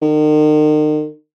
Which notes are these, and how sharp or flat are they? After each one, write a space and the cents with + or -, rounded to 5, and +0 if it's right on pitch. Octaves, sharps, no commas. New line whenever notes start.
D#3 -40